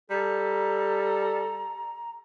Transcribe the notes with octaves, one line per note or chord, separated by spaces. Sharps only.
G3 A4 A#5